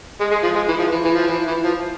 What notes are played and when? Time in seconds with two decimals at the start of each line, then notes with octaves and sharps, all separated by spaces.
0.20 G#3
0.31 G#3
0.43 F3
0.55 G#3
0.68 E3
0.79 F3
0.92 E3
1.04 E3
1.15 F3
1.27 E3
1.47 E3
1.64 F3